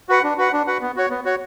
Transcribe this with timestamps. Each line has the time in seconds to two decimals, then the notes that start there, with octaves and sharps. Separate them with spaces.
0.09 F#4 B4 F#5
0.24 D4
0.38 F#4 B4 F#5
0.53 D4
0.67 F#4 B4 F#5
0.81 B3
0.96 F#4 C#5
1.10 B3
1.25 F#4 C#5